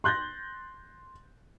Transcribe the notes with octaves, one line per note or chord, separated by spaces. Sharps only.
C6 F#6 G6 A6 A#6